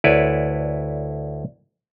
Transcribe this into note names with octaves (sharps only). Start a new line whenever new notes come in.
D2 E4 B4 C#5 D5